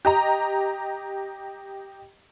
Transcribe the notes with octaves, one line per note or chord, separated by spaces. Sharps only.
G4 D#5 A#5